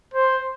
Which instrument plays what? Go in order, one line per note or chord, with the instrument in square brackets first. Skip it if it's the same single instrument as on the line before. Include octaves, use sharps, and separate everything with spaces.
[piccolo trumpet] C5